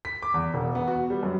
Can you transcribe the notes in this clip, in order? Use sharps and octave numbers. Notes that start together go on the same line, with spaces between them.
B6
D6
E2
E1
B3
F#4
G3
F#2